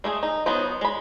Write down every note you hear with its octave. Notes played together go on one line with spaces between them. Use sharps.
G#3 A3 F#4 G#4
D#4
F#3 B3 D#4 C5
G#3 B5